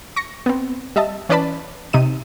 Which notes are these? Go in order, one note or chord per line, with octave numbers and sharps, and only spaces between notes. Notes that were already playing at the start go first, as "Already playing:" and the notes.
C#6 A#6 C#7
B3 C4
G3 D#5 E5 A5
E3 C#4 B4 D5 A5 B5
C3 D#4 D#7